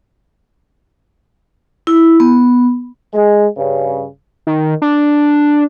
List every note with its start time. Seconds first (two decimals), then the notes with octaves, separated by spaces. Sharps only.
1.87 E4
2.20 B3
3.12 G#3
3.56 G2 C#3
4.47 D#3
4.82 D4